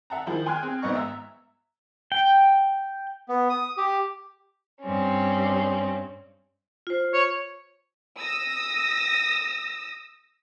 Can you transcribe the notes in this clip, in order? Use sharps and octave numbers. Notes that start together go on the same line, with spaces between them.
E5 F#5 A5 A#5
D#3 F3 E4 G#4 C5
G5 G#5 C6 F6 F#6 G#6
C4 G#4
A#1 G#2 B3 D#5 C#6
E5 A#5 E6
G5
B3
D#6
G4
G2 C4 C#4
F4 C5
C#5
D#6 E6 A#6